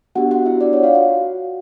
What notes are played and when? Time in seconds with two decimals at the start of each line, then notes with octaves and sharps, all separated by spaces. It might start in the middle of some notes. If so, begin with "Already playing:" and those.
0.15 B3 D4 F#4 G4 F#5
0.31 F#4 F#5
0.46 E4 E5
0.61 D4 D5
0.73 C#5
0.83 F4 F5
0.95 F#4 F#5